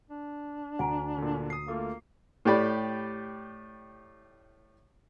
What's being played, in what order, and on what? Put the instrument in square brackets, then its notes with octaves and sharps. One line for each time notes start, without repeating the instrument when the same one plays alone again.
[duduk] D4
[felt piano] D2 [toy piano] F#5 G#5 A#5
[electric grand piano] A#2 D3
D#6 C7
[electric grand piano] A3 F4 A4 [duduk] A#3 [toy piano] D6
[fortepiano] A2 G4 D5 B5